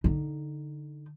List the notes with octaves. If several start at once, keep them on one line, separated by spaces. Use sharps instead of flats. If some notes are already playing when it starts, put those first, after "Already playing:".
D3 D#4